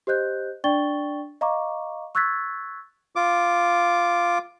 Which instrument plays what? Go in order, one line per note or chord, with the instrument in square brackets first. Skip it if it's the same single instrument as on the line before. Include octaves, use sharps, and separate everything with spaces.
[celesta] G4 C5 D#5 F#6 G6
D4 D5 G5 C#6 A6 G7
D#5 F5 A#5 C#6 D6
C#6 E6 F#6 G#6 A6 B6
[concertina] F4 D6